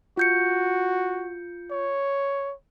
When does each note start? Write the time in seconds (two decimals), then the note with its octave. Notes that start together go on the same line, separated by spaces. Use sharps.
0.17 F4 F#4 G6 C#7
1.71 C#5